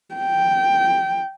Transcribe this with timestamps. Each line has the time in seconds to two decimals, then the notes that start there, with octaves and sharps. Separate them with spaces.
0.15 G5